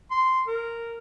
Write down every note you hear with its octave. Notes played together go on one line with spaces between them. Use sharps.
C6
A#4